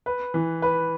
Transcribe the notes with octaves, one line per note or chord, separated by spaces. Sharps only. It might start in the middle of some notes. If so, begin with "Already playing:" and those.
B4
E3
B4